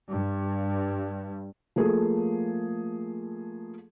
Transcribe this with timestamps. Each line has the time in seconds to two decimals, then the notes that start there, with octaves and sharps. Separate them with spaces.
0.11 G2
1.76 F3 A3 A#3 G#4 A4